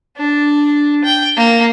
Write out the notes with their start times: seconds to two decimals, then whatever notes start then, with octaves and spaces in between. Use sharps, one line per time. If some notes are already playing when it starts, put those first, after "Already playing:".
0.17 D4
1.04 G5
1.37 A#3